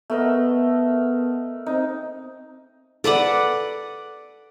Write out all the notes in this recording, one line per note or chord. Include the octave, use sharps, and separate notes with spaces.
A3 B3 A#4 D#5
C4 D#4
A4 B4 D5 F#5